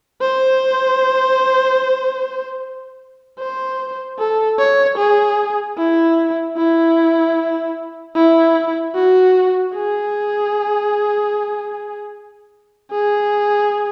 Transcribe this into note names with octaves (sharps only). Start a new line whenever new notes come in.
C5
C5
A4
C#5
G#4
E4
E4
E4
F#4
G#4
G#4